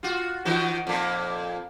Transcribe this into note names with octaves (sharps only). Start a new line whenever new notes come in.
F4 F#4
D#3 E3 F#4
F2 A#2